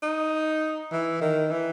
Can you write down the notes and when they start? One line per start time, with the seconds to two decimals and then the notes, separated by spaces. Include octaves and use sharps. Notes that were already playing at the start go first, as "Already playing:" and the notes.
0.03 D#4
0.92 E3
1.21 D#3
1.51 E3